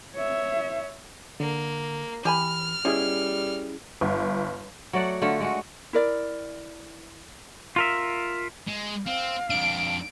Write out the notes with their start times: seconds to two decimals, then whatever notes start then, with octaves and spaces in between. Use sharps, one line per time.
0.15 C#5 E5
1.40 D3 A#3
2.25 E3 G4 G#5 B5 F6
2.85 B2 G3 C#4 E4 G#4
4.01 G1
4.93 F#3 A3 D5 F#5
5.22 D3 A3 F4 F#4
5.40 G#3 A3 F#4
5.93 E4 A#4 D5
7.76 F4 A#4 E5
8.68 G#3
9.07 C4 F5
9.50 F2 D4 D7